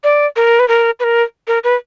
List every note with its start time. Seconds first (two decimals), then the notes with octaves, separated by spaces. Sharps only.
0.04 D5
0.36 A#4
0.59 B4
0.68 A#4
1.00 B4
1.04 A#4
1.48 A#4
1.64 B4